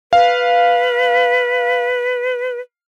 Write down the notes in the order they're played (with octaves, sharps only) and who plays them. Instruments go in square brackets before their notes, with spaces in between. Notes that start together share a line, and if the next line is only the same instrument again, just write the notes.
[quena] B4 [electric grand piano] F5